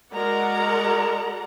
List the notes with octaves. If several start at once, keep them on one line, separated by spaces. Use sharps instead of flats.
G#3 F#4 A#4 D5 F#5 A#5